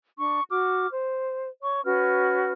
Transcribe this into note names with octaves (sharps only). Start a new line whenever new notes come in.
D4 C#6
F#4 D6 F6
C5
C#5 C#6
C#4 F#4 B4 F6